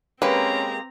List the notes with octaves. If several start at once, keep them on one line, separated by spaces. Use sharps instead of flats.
G#3 A#3 C4 C#4 G4 B4 A#5